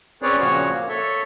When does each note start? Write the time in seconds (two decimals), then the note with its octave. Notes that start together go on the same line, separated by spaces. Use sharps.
0.22 C4 C#4 G#4 B4 C#5 D5
0.40 A#2 C#3 F3 F#4 C#5
0.72 A#3
0.89 A4 C#5 E5